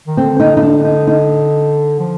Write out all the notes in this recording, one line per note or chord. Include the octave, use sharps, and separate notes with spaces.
D#3
D3 C4
D#4
D#4
D4
D#4
D#4
F3